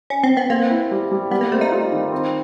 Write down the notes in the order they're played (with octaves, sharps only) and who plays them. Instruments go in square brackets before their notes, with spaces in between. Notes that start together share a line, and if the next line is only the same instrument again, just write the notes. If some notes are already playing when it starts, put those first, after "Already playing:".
[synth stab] C#4
C4
B3
[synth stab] A#3 [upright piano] C4
[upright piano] E4
G3
G3
[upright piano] G3 [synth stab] B3
[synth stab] A#3
[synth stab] A3 [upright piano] C4
[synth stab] D#4
[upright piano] F4
D#3
C4